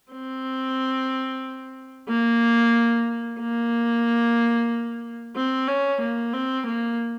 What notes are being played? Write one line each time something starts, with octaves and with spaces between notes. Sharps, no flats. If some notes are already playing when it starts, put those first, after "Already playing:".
C4
A#3
A#3
C4
C#4
A#3
C4
A#3